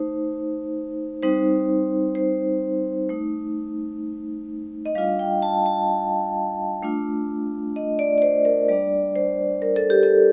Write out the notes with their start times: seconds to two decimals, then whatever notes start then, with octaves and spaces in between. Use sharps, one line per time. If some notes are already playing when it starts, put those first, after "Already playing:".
Already playing: A3 D#4 C5
1.23 G3 C4 D#4 C5
2.15 C5
3.09 A3 D#4
4.85 D#5
4.95 G3 D4 F4 F5
5.19 G5
5.42 A5
5.66 A5
6.82 A3 D4 F4
7.76 D#5
7.99 D5
8.18 D5
8.22 C5
8.45 A#4
8.69 G3 A#3 D4 D5
9.16 C5
9.62 A#4
9.76 A4
9.90 G4
10.03 A4